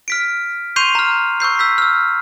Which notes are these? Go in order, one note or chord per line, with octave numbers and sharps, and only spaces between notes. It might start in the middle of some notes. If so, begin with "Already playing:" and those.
F6 B6 D7
C6 C#6 G6 C7 D#7 F7
A#5 F6
C#6 E6 G6 C7
E6 G6 B6
E6 F6